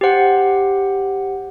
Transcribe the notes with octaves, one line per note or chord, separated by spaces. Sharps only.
G4 C5 F#5